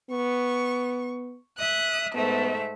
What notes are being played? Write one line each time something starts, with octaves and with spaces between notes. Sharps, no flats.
B3 C#6
E5 D#6 F#6
G#2 A3 B3 E5